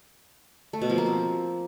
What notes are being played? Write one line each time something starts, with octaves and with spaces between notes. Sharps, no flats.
A3
B2
F3
A#3
C4